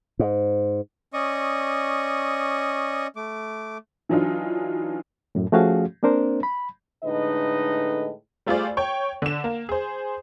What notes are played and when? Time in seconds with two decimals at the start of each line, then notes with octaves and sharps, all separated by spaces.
0.19 G#2
1.13 C#4 D5 D#5 C#6 D#6
3.16 A3 D6
4.09 E3 F#3 D4 D#4 F4
5.35 F#2 A2
5.52 F3 A3 C#4 F#4 G#4 F5
6.03 A#3 C4 D4 A#4 C5
6.43 B5
7.04 A2 D3 G#3 D#4 B4 D#5
8.46 G3 A3 F4 G#4 C5 D5
8.77 C#5 G5 C#6
9.22 D3 E7
9.44 A#3
9.69 G#4 C5